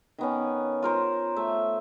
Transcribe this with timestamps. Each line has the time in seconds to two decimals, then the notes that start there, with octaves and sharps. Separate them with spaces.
0.18 D#3 B3 C#4
0.82 F4 A#4 C5
1.36 A3 E5